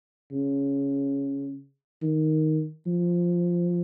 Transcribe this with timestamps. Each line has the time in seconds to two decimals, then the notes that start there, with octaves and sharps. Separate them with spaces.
0.32 C#3
2.02 D#3
2.86 F3